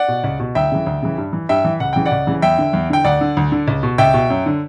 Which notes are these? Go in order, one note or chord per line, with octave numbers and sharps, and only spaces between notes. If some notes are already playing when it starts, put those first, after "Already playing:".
Already playing: D5 F#5
B2
C#2
B2
D2 E5 G5
C#3 E3
D2
C#3 E3
G2
E3
G2 E5 G5
E3
C#2 F#5
C#3 E3 G5
D5 F#5
C#2
C#3 E3
E2 E5 G5
D3
E2
D3 G5
D2 D5 F#5
D3
D2
D3
C#2
B2
C#2 E5 G5
B2
F#2
D3